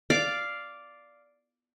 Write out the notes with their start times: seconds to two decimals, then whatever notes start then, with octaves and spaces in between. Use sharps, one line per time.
0.10 D5 F5 D6